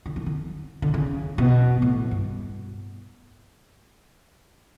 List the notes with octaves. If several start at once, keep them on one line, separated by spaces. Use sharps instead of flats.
D3
D#3
D3
D3
C#3
B2
A2
G2